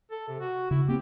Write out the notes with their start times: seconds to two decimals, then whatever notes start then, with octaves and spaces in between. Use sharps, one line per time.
0.11 A4
0.28 C3
0.40 F#4
0.71 C#3 E4
0.88 A#3 C4 G4